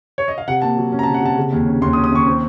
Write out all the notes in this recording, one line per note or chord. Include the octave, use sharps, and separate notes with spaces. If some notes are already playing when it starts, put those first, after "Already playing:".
C#5
D#5
F5
C3 F#5
A#3 A5
F#3
C#4
A#5
A5
C3
F#5
C3 A5
C#3
D#2
C#4
D#2 C6
D#6
C#4
D#6
D#2 C#6
C4